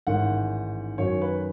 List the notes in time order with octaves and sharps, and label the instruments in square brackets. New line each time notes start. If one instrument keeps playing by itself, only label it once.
[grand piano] A1 G#2 D#3 F#5
F#2 D#3 F#3 C#5
B4